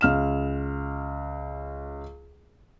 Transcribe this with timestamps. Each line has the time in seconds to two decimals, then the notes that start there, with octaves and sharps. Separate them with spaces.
0.01 C#2 F6 E7